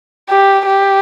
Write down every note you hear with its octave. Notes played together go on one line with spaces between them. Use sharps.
G4
G4